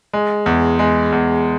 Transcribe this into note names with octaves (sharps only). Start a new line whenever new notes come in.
G#3
E2
G#3
E2